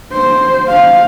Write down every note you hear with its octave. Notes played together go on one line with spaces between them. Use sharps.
C5
F5